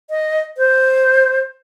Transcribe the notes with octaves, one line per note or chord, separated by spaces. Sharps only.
D#5
C5